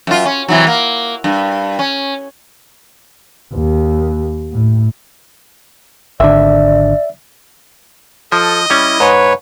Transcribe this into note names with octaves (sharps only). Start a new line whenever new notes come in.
F#2 F4
C#4
C3 E3 F#3
A#3
G2
C#4
D#2
A2
G#1 D3 D5 E5
F3 A4 D#5
G3 C#4 E4
G#2 B4 C#5